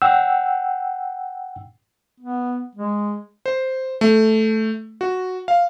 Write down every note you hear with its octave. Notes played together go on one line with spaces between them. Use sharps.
F#5 G5 E6
B3
G#3
C5
A3
F#4
F5